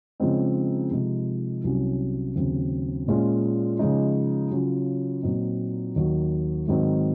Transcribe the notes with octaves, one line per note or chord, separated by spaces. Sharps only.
C#3 F3 G#3 C4 D#4
C3 F3 G#3 D#4
C2 C3 F#3 C#4
D#2 C#3 F#3 C4
A#2 G#3 C#4 F4
C#3 F3 G#3 D#4
C#3 F#3 C#4 F4
A#2 F#3 C4 D#4
D#2 D#3 F#3
G#2 D#3 F#3 C4 D#4